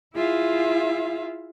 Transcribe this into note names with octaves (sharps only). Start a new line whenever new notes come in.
E4 F4 G#4 E5 F5